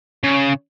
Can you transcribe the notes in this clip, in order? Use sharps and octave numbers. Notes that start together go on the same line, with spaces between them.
C#3